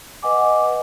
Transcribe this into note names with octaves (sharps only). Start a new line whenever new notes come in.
B4 D#5 F#5 G#5 D6